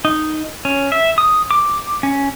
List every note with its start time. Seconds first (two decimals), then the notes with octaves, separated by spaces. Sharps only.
0.05 D#4
0.65 C#4
0.92 E5
1.18 D#6
1.51 D6
2.03 C#4